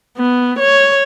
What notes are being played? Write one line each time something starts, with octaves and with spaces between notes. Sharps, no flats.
B3
C#5